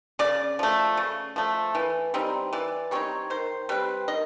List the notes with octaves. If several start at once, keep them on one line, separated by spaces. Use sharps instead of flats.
C#3 D5
F3 A3
C#3
F3 A3
E3
G3 C4 D#4
E3 D5
G3 C4 D#4 C#5
D#3 C5
G3 C4 B4
D#3 D#5